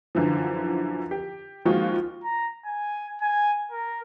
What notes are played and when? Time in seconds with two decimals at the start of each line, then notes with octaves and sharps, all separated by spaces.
0.15 F#2 D3 E3 F3
1.11 G4
1.65 D#3 F3 G#3 A#3 F4 F#4
2.24 A#5
2.65 G#5
3.21 G#5
3.71 A#4